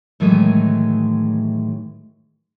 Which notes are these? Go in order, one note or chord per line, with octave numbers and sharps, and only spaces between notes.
A2 D#3 E3 F#3 G#3 A3